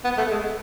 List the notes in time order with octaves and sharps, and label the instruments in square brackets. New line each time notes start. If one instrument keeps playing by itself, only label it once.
[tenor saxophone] B3
A3
G#3